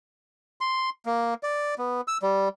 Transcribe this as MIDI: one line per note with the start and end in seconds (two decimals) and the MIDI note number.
0.61 0.90 84
1.06 1.34 58
1.43 1.75 74
1.78 2.01 59
2.08 2.18 88
2.22 2.49 55